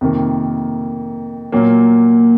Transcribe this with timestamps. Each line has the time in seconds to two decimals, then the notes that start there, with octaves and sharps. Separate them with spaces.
0.01 F2 C3 D#3 A#3
1.52 A#2 F#3 A#3